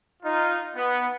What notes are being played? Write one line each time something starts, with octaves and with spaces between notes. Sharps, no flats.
D#4 F4
B3